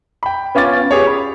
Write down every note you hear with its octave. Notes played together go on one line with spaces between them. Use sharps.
G5 B5
B3 C#4 F4 D6 A6
G4 G#4 C#5
B5